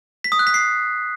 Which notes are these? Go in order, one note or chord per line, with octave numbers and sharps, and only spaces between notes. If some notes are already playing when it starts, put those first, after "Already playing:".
B6
D#6
F#6
B6
C7